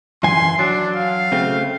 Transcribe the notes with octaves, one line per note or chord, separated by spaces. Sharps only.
F#2 E3 G#5 C6
F#3 D4
F5
C#3 A3 C4